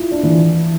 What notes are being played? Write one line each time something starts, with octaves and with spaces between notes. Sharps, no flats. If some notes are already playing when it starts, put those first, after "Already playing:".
Already playing: E4 F4
D4
E3